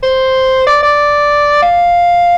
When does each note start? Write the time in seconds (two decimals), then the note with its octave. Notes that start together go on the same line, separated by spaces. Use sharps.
0.03 C5
0.67 D5
0.83 D5
1.62 F5